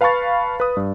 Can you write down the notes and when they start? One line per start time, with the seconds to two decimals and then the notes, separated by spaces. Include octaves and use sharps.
0.01 B4 F5 A5 B5 C#6 A6
0.60 B4 D#6
0.77 G2